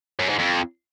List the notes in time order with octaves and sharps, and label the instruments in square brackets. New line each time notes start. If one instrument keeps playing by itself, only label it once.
[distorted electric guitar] F#2
G#2
F2